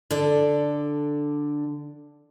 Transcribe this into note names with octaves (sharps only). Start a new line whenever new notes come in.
D3 D4 A4 D5